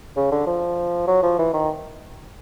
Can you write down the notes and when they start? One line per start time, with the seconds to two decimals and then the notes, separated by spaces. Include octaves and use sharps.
0.17 C#3
0.32 D3
0.47 F3
1.07 F#3
1.23 F3
1.39 E3
1.53 D#3